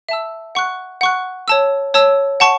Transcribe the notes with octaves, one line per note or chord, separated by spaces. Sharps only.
E5 A5 E6
F#5 C#6 F#6
F#5 C#6 F#6
C#5 A5 E6
C#5 A5 E6
F#5 A5 C#6